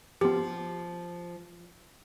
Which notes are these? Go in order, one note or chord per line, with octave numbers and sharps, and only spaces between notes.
F3 B3 G4